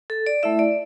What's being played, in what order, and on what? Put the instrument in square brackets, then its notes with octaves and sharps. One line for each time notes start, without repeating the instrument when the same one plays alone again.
[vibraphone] A4
D5
A3 E4 E5
D5